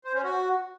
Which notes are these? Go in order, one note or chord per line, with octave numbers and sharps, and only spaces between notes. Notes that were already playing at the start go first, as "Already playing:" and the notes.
C5
C#4
F#4